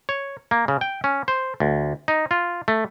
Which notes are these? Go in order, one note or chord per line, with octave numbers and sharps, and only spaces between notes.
C#5
A#3
C#3
G5
C#4
C5
D2
D#4
F4
A3